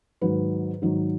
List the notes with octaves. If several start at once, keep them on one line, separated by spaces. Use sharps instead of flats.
G#2 D#3 F#3 B4
G#2 D#3 F#3